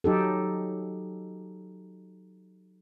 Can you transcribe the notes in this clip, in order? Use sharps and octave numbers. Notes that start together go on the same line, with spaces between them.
F#3 D#4 G4 A4